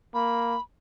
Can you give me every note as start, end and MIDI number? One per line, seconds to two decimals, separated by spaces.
0.14 0.56 58
0.14 0.61 83